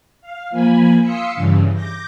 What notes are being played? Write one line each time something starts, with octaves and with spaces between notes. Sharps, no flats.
F5
F3 A#3 G#5 B5
F5 C6 D#6 E6 B6 C#7
G2 C#3 E3
D6 G6 A#6